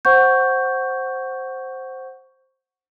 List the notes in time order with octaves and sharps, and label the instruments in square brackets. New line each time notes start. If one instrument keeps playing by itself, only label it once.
[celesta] C5 F#5 C#6 G6